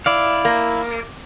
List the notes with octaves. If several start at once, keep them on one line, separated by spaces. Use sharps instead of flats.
E4 D5 F5
A#3